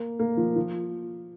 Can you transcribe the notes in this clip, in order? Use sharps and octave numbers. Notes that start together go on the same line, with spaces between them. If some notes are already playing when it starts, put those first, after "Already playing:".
Already playing: A#3
A#3
F3
F3